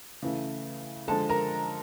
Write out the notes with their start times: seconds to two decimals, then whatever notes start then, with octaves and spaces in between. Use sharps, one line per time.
0.22 C#3 E3 A3
1.08 D3 F3 G#3 A4 A5
1.29 A#4 A#5